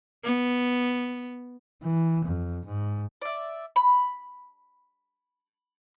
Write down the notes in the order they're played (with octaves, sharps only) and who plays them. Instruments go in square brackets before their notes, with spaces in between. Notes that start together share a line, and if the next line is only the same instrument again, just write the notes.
[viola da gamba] B3
[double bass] E3
F2
G#2
[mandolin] D5 E5
B5